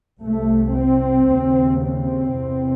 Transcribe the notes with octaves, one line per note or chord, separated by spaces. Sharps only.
C2 C3 A3
C4
D#2 C#3
C4
E2 C3